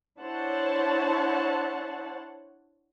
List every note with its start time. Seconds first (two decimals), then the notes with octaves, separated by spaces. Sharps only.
0.20 D4 E4 C5 C#5 F#5 A5